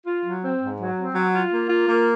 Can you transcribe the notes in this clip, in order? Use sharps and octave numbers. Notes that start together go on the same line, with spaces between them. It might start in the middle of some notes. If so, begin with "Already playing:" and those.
F4
F#3
C4
G#2
F#3
C4
F#3
F4
A#3
F4
A#3